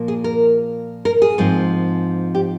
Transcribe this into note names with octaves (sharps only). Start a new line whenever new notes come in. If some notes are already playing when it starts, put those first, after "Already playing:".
Already playing: A#2 F3 A#3
G#4
A#4
A#4
G#4
G#2 F3 C4
G4